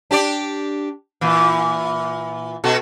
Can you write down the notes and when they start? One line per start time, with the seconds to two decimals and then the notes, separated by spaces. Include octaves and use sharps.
0.11 D4 G4 D5
1.21 A#2 E3
2.64 B2 F#4 A4